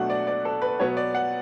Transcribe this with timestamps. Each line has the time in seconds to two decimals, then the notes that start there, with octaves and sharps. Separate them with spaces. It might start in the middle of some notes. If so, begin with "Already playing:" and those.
Already playing: B2 F#3 A3 D4 F#5
0.10 D5
0.27 D5
0.45 A4
0.62 B4
0.80 B2 F#3 B3 C#5
0.97 D5
1.15 F#5